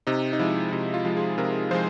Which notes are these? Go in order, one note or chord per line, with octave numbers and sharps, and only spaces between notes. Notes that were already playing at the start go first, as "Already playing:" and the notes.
C3 D#4
D#4
F3 G#3 E4
C3 E4
F4
F3 G#3
G#4
C3 A#4
F3 G#3 C5